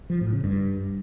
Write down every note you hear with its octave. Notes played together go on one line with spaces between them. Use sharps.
F3
A2
C#3
G2